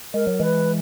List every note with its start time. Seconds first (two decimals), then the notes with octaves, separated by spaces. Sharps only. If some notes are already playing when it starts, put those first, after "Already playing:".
0.14 G#3 A#4
0.27 F#3
0.40 E3 G#3 B4